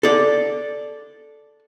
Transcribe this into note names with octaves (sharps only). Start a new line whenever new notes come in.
A4 D5